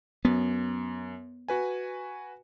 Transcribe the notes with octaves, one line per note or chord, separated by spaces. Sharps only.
F#2 B3
F#4 B4 G#5